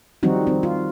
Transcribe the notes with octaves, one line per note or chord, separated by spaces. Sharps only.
D#3 F3 G3 C4 D#4 F#4
C4
F4